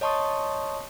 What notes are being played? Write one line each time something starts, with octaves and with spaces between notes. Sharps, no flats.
C#5 D#5 A5 C6 C#6 D#6